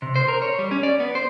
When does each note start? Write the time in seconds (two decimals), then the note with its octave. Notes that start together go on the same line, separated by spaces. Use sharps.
0.02 C3
0.16 C5
0.28 A#4
0.42 C#5
0.59 G3
0.71 C#4
0.83 D5
1.00 B3
1.15 C5